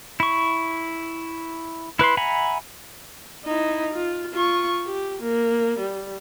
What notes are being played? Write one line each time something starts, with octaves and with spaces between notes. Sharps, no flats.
E4 C#6
E4 B4 B5 C6
E5 F#5 G#5 A#5 B5
D#4 E4
F4
F4 C#6
G4
A#3
G3